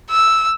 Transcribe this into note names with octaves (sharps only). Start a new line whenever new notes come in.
E6